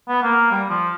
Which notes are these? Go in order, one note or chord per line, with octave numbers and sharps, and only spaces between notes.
B3
A#3
G3
F3